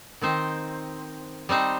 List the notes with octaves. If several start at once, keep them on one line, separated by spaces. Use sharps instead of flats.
D#3 C4 D#4 C5
G3 C4 D#4 C5